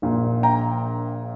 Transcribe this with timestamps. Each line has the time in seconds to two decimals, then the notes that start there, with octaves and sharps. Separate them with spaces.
0.02 A#1 A#2 A#3
0.43 G5 A#5